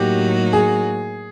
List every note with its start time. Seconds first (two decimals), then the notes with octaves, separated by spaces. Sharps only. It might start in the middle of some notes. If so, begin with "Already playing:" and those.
Already playing: A2 F#3 A#3 D#4 F#4 G4
0.53 G#4